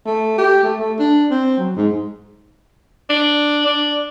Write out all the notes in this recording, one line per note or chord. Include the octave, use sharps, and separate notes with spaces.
A3
G4
A3
A3
D4
C4
F#3
G#2
D4
D4